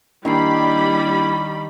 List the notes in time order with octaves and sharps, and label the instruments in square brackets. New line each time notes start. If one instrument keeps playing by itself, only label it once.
[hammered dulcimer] D#3 [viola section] G3 B5 [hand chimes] A#3 D4 C7 [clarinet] E4